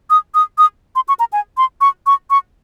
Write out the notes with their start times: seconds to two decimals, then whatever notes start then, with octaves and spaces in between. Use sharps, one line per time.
0.10 D#6
0.35 D#6
0.58 D#6
0.95 C6
1.08 C#6
1.19 A#5
1.33 G#5
1.57 C6
1.81 C#6
2.06 C#6
2.30 C#6